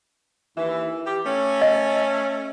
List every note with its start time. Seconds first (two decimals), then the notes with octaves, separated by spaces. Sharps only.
0.57 D#2 E3
1.07 G4
1.26 A3 C#4
1.62 D#5